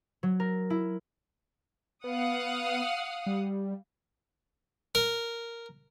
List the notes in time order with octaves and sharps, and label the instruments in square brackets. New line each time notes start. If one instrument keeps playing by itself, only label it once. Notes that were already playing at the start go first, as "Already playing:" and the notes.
[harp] F#3
A#4
E4
[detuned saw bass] B3 [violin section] F5 F#5 D#6
[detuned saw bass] G3
[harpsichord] A#4